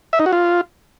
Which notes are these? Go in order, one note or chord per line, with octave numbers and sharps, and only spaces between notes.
E5
D#4
F#4
F4